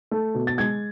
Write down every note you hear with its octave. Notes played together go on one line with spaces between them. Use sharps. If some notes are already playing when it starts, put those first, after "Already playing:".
A3
B2
A6
G#3 G#6